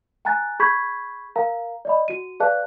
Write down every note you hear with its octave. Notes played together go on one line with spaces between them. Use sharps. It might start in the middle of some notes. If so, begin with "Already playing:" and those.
G5 G#5 A#5 F#6 A6
G#4 B5 C#6 G6 G#6 B6
A#4 F5 A#5
D5 D#5 B5
F#4 D#7
G#4 B4 D5 F5 A5 F#6